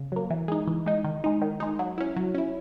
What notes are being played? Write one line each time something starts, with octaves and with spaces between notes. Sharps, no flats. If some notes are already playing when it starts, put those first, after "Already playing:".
Already playing: C#3
F#3 A#3
E3
G#3 D#4
E3
G#3 D#4
D#3
G#3 D#4
D#3
G#3 D#4
F#3
C#4 E4
F#3
C#4 E4